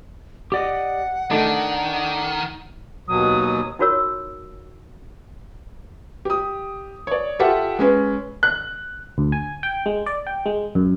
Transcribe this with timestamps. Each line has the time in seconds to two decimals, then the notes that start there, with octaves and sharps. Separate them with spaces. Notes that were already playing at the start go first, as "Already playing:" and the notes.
0.52 G4 D5 D#5 F#5
1.31 D#3 A3 D4 D#4
3.08 D#2 B2 F#3 D#6
3.79 D#4 F4 F#4 A#4 C#5 E6
6.25 G4 D#6
7.07 C#5 D5
7.39 F4 G4 A4 E5 F#5
7.79 G#3 C#4 B4
8.43 F#6
9.18 D2
9.32 G#5
9.63 G5
9.86 G#3
10.06 D5
10.27 G5
10.46 G#3
10.75 F#2